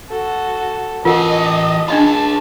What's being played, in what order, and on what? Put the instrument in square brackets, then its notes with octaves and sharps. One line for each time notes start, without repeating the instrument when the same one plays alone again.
[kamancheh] F#4 A4
[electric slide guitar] E3 A4 A5 [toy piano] F4 A#4 F#5 [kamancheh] D#5
[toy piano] D4 D#5 B5 [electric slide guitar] F4 G#4 [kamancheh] A5